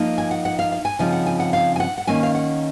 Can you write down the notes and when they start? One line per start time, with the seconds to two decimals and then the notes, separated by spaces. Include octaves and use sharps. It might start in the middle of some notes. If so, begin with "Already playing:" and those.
Already playing: F3 A#3 D#4
0.18 G#5
0.31 F#5
0.45 F#5
0.59 F5
0.72 F5
0.85 G#5
0.99 C#3 F3 C4 D#4 G#5
1.12 F#5
1.26 G#5
1.40 F#5
1.53 F5
1.76 G#5
1.80 F#5
1.98 F#5
2.07 D#3 A#3 C#4 G#5
2.23 F5
2.35 F#5